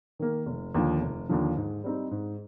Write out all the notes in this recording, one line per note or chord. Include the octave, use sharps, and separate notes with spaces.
D#3 A#3
F1
D#2 D3 F3
F1
D#2 D3 F3
G#2
G3 C4 D#4
G#2